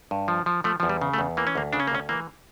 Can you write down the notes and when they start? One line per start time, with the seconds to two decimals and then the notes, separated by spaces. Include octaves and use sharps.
0.11 G2
0.28 F3
0.46 F3
0.64 F3 A3
0.80 E2 F3
0.89 G3
1.01 C#3
1.14 A3
1.19 E2
1.37 E3 A#3
1.47 C#4
1.55 D2 A#3
1.73 C#3 D4
1.80 C#4
1.87 A#3
1.92 D2 C#4
2.09 E3 A#3